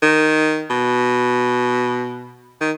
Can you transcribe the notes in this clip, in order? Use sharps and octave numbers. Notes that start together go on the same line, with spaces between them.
D#3
B2
D#3